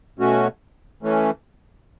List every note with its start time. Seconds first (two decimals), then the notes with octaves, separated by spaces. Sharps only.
0.19 B2 A3 C#4 F#4
1.02 E3 A3 C#4